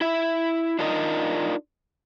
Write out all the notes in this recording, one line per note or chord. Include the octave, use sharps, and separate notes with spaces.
E4 E5
D4 D#4 F4 A#4 D5 D#5